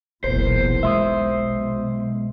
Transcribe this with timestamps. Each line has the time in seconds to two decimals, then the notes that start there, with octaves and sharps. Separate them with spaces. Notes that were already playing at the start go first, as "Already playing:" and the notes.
0.24 F1 B1 E2 A#2 C5
0.83 B1 G#3 E5 C6 D#6